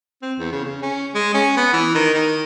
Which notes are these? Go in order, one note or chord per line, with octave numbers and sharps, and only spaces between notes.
C4
E2
C#3
C#3
C#4
G#3
C#4
B3
E3
D#3
D#3